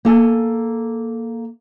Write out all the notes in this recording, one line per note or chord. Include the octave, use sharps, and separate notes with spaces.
A#3 A4 G#5